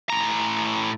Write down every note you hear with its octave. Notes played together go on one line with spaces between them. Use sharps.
A2 A#5